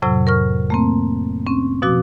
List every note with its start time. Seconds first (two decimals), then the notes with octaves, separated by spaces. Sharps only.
0.02 F2 A2 C3 F#3 E6
0.27 A#4 C#6 F6
0.70 A3 A#3 C4
1.47 C4 C#4
1.82 B2 F3 F#4 D6